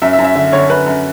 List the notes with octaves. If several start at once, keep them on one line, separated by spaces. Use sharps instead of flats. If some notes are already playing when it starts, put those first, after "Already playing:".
F#2 E5
E5
F#2
E5
D3 E5
D3 C#5
F#2 B4
F#2